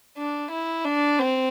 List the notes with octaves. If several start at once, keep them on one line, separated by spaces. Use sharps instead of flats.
D4
E4
D4
C4